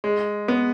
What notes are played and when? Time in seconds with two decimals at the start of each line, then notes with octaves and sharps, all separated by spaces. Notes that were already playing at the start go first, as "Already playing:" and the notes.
0.04 G#3
0.48 B3